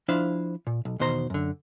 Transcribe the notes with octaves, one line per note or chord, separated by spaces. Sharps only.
F3 D4 E4 C5 F5
A#2
B1
E2 B2 D#3 C5 A#5
F#2 D3